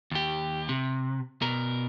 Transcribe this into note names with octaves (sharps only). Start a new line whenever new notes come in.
D#2 G4
C3
B2 A#4